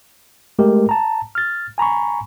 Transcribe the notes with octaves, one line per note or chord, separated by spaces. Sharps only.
G#3 A3 G4 A#4
A5 A#5
F6 A6
G#5 A#5 B5 C#6